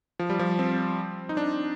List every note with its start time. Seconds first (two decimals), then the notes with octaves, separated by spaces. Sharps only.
0.19 F3
0.30 G3
0.39 F3
0.59 C4
1.29 D#4
1.37 D4